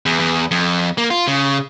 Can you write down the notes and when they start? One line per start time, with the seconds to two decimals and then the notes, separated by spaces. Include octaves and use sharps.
0.06 E2
0.19 E2
0.51 F2
0.98 A#3
1.11 F4
1.28 C#3